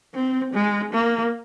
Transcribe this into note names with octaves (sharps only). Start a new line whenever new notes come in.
C4
G#3
A#3